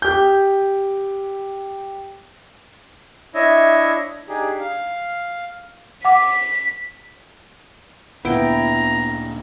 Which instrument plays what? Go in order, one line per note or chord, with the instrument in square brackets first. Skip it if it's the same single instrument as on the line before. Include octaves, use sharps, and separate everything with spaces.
[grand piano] G4 G6
[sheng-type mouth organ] D4 E4 C#5 D#5 E5
D4 D#4 G4 G#4
F5
[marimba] F#5 D6 [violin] B6
[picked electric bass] D2 A#2 D3 [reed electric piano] B3 [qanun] E4 G5 [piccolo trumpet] A#5